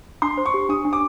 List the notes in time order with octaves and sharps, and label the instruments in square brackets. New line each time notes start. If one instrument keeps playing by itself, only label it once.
[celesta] D4 [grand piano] C6
[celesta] C5
[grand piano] C#6
[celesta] G4
[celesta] D4 [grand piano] D#6
[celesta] D4
[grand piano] D6